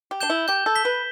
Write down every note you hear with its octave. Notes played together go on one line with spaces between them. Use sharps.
G4
D4 G6 E7 G7
E4
G4 G6
A4
B6 G7
B4